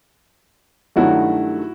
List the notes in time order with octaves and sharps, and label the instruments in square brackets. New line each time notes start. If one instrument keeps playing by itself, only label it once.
[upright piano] G2 D#3 F#3 A3 E4 F#4